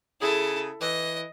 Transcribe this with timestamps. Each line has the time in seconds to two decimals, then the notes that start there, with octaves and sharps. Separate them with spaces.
0.20 C#3 E4 G#4 A4
0.81 E3 D#5